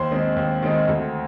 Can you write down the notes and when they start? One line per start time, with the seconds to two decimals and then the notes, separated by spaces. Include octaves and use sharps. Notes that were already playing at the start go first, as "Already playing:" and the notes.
Already playing: D#2 C5 C6
0.11 D#3 G#3 C4
0.36 D#2
0.62 D#3 G#3 C4
0.88 D2